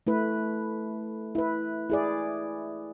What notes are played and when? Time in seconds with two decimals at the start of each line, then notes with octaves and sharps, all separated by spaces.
0.07 A3 E4 B4
1.35 E4 B4
1.90 E4 G#4 D5